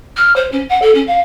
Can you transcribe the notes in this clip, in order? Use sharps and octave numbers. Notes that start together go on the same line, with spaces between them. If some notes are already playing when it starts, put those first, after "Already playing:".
F6
C5
C#4
F#5
A4
C#4
F5